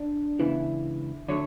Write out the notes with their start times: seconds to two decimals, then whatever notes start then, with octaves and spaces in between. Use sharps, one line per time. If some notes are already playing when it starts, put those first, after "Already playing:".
Already playing: D4
0.39 C#2 C#3 E3 B3 E4
1.28 D3 F#3 A3 C#5